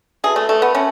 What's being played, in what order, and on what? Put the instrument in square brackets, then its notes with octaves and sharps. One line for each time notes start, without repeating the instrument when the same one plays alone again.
[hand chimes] F#4 B4 E5 A5 [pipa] G#4
[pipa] A3
A3
B3
[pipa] C#4 [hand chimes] E5 A5